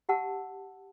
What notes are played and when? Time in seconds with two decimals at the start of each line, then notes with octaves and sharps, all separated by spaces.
0.09 G4 F#5 A5 E6